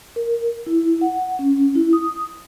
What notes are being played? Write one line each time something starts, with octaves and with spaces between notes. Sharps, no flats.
A#4
E4
F#5
C#4
E4
D#6